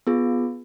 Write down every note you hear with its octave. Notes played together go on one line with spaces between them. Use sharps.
B3 F4 G#4